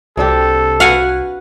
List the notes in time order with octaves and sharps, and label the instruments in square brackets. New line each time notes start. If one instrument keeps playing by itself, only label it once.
[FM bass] C2 [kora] C3 D4 G4 [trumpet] A4
[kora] F#4 B4 [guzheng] F5 F#5 G#5